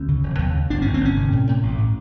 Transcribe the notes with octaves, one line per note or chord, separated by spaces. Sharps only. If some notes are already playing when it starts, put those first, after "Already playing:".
Already playing: D2 C#4
C#3
E1
D#2
C#3
G1 D4
G1 C#4
C4
G1 C#4
C3
A2
A2
A1
A2